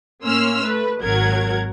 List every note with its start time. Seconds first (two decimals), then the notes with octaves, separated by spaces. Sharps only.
0.25 A2 A#3 C#4 C6 E6 F6
0.62 A3 B4
1.01 G#1 F#3 A#4 F#5 G#6